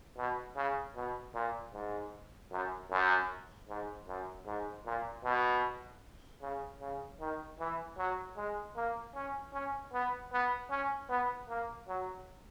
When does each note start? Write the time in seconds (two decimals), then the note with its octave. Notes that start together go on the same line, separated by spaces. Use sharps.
0.17 B2
0.56 C#3
0.96 B2
1.35 A#2
1.73 G#2
2.51 F#2
2.91 F#2
3.69 G#2
4.07 F#2
4.47 G#2
4.86 A#2
5.24 B2
6.42 C#3
6.81 C#3
7.20 D#3
7.60 E3
7.98 F#3
8.37 G#3
8.76 A#3
9.15 C#4
9.53 C#4
9.93 B3
10.33 B3
10.71 C#4
11.10 B3
11.49 A#3
11.88 F#3